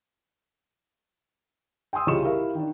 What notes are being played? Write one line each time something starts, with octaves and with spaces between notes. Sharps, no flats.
G5 G#5 C6 D#6 E6
C2 C#3 F4 D#5 C#6 E7
E4 G4 A#4 F5
D#3 D4